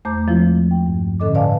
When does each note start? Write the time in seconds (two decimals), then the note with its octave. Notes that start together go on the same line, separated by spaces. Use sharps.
0.05 E2 A3 C5 A#5 D6 G6
0.28 F3 G#3 A3 C4 E4 F4
0.71 G5
0.86 G2
1.20 A2 D3 C#4 A4 D#5 D6
1.35 B4 D5 F5 G#5 A5